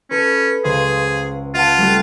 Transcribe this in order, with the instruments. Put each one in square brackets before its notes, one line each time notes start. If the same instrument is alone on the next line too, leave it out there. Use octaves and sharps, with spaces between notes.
[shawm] C#4 [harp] A4 B4
[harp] C#2 C5 F5 [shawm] G#4
[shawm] F4 [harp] F5 F#5 A5
[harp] G3 A3 G4